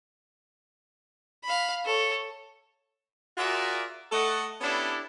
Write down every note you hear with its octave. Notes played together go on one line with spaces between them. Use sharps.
F5 B5
A4 C#5
F4 F#4 G#4 A#4 D5 E5
A3 A4 D#5 F#5
B3 C#4 D4 E4 G4 A4